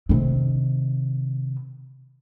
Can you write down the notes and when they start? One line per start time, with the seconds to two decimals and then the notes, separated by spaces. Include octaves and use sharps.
0.09 C3 D#3